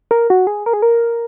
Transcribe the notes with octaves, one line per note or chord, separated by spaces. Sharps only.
A#4
F#4
G#4
A#4
G#4
A#4